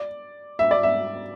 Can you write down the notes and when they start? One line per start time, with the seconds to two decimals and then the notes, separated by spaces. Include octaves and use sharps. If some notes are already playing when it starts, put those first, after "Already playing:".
Already playing: D5
0.59 E5
0.71 D5
0.83 E5